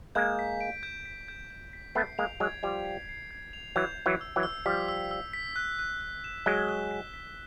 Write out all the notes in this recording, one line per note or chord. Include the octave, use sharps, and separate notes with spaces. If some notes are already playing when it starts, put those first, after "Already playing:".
G#3 A#3 G6
B6
D7
G6
B6
G6
G6
B6
A3 B3 C7
G#3 A#3 F7
F#3 G#3 G#6
F3 G3 F7
C7
C7
G#6
F7
E3 F#3 G6
G6
E3 F#3
E6
E3 F#3
E6
F3 G3 B6
E6
E6
B6
F#6
F#6
F#6
E7
F#3 G#3 G7
F#6
B6
B6